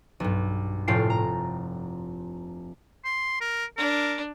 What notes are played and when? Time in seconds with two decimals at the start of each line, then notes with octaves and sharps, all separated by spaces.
0.20 B1 G2
0.88 F1 A2 F4 G5 C7
1.10 A#5
3.04 C6
3.41 A#4
3.77 D4 A#4